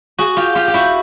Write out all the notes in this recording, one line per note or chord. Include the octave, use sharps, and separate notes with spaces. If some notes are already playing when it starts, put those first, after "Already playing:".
F#4 G#4
F4 G4
F4 G4
G4
E4 F#4